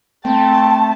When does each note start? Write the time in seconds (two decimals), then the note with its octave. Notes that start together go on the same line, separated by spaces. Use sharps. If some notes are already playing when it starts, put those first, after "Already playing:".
0.25 A3 C4 G5 A5